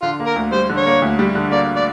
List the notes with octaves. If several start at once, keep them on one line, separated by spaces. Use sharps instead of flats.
D3 F4
A#3
A#4
D2
G3 C5
D3
C#5
A#3
D2
G3
D3
A#3 D5
D5